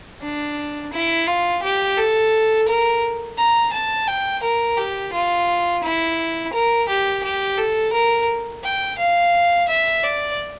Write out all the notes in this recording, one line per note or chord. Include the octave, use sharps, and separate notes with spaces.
D4
E4
F4
G4
A4
A#4
A#5
A5
G5
A#4
G4
F4
E4
A#4
G4
G4
A4
A#4
G5
F5
E5
D5